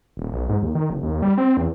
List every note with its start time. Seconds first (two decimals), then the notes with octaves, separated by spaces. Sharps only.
0.17 D#1
0.32 B1
0.49 G#2
0.62 D#2
0.75 D#3
0.90 F#1
1.03 D#2
1.22 G3
1.38 C4
1.57 E2